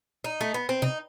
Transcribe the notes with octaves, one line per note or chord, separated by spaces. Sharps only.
D#4
A3
B3
C4
C3 D#4